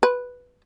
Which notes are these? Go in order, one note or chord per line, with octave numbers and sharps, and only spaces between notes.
B4